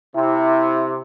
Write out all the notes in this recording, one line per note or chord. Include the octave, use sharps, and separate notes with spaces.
C3 E4